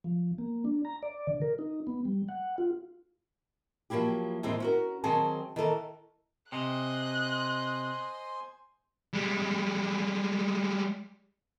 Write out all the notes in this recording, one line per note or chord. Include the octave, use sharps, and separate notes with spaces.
F3
A#3
D4
A#5
D5
D3
A#4
D#4
B3
G3
F#5
F4
F3 F#3 A#3 E4 G4
D#2 A2 E3 G#3 C4 C5
C#4 F#4 A#4
D#3 F#3 C4 G#4 G#5 A5
D#3 E3 A4 A#4
C3 C5 D#5 G#5 C6 F#6
G3 G#3